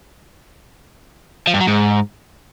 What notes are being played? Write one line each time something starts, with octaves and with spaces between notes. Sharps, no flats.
F3
G2
F#3
G#2